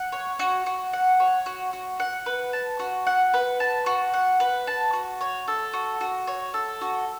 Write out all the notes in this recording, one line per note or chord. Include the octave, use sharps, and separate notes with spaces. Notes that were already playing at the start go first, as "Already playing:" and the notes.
Already playing: F#5
C#5
F#4
F#4
F#5
C#5
F#4
F#4
F#5
B4
A5
F#4
F#5
B4
A5
F#4
F#5
B4
A5
F#4
C#5
A4
F#4
F#4
C#5
A4
F#4